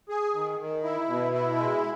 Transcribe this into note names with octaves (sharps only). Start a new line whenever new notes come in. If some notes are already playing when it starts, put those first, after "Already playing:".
G#4
D#3
D#3
E4
B2
E4
G#3